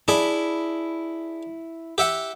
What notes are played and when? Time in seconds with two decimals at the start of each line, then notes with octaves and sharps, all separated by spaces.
0.08 D4 E4 G#4 B5
1.98 G4 E5 F#5